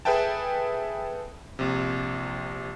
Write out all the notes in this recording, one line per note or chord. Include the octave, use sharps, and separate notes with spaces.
G#4 A4 B4 E5 G5 A5
A#1 C3